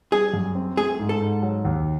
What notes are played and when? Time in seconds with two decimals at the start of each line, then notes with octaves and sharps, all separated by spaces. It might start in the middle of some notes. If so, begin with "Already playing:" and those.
0.12 G3 G#4
0.34 F#2
0.55 C4
0.77 A3 G#4
0.99 G#2
1.09 A4
1.21 G#2
1.42 F#3
1.65 D#2